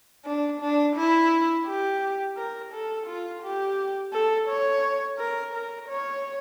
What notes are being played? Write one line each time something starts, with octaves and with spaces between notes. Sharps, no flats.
D4
D4
E4
G4
A#4
A4
F4
G4
A4
C#5
A#4
A#4
C#5